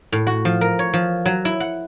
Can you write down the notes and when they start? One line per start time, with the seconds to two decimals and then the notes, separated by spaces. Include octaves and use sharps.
0.12 A2
0.27 F#4
0.45 F3
0.61 A#4
0.79 C#5
0.93 F3
1.25 F#3
1.45 E4
1.60 F#5